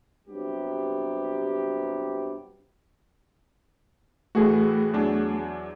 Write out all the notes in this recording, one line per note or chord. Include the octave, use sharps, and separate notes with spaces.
G2 C3 F#3 B3 G4
A2 E3 A3 F#4 G#4
E2 F#3 D4